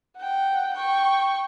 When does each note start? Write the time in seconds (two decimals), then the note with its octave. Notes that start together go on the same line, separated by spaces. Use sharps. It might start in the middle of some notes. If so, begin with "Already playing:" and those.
0.18 F#5 G5
0.73 G5 C#6